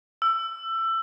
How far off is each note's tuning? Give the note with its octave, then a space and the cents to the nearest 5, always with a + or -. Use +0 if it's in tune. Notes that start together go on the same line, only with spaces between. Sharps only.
E6 +20